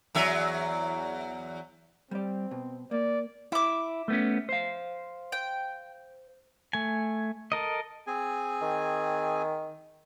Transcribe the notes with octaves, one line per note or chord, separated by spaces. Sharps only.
E2 F#3 E5
G3 C4 D5
B2
A#3 D5
E4 E5 D6
A3 B3 C#4
C5 F5
G5
A3 G#5
A4 A#4 D#5
C4 G#4 G#5
D#3